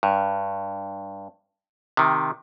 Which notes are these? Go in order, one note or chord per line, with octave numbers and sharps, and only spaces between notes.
G2
C3 D#3